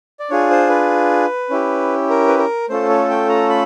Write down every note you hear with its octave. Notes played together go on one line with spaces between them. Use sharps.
D5
D4 F4 G#4 C#5
C5
B4
C#4 E4 G4
A#4
B4
A#4
A3 C#4 F4 A4 C5
C#5
G5
A#5
B5